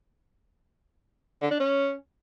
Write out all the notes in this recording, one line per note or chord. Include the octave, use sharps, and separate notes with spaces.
D3
D4
C#4